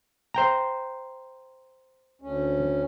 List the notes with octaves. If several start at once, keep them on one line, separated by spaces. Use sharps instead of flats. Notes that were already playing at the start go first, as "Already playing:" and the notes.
C5 G5 A#5
D2 C#4